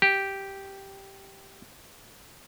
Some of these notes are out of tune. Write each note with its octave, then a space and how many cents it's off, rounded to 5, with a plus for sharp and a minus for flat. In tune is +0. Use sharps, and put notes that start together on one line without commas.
G4 -5